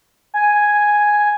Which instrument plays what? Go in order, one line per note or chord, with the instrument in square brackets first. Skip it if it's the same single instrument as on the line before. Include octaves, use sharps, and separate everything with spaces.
[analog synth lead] G#5